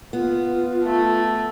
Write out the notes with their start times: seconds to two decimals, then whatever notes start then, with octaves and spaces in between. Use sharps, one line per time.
0.13 B3 F4
0.84 A3